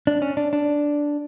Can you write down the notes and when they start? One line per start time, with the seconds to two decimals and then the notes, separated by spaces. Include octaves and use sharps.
0.07 D4
0.22 C#4
0.37 D4
0.53 D4